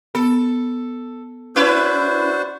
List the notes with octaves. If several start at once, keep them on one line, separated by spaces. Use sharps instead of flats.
B3 A4
C#4 D4 E4 F#4 B4 C5